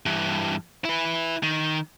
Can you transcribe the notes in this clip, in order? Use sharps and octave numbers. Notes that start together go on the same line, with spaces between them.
G2 E3
E4 B4
D#3